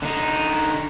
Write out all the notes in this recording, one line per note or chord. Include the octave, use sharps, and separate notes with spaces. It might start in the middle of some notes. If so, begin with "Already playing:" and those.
D3 D#4